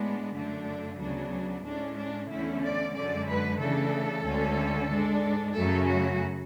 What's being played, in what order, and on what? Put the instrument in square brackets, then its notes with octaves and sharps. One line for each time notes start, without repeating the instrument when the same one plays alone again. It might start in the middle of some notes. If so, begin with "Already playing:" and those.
Already playing: [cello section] A2 G#3 B3 D4
F#2 D3 A3 D4
D2 C#3 F#3 B3 D4
A2 G#3 C#4 D4
D4
E2 D3 A3 C#4 E4
D5
F#2 D3 G#3 D5
B4
C#3 E3 A3 D4 A4
D2 D3 G#3 C#4
G#2 G#3 D4
F#2 C#3 F#3 A3 C#4 A4
F#4